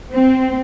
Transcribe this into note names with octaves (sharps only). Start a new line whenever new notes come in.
C4